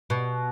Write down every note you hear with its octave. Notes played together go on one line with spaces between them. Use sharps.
B2